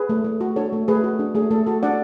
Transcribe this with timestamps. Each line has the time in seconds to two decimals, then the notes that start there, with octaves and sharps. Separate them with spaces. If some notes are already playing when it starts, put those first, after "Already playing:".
Already playing: G#4 B4
0.09 A3
0.25 A3
0.41 F#4
0.56 D4 A4 C#5
0.73 A3
0.88 A3 G#4 B4
1.04 F#4
1.19 D4
1.35 A3 G#4
1.50 A3 A4
1.67 F#4 A4
1.83 D4 D5 F#5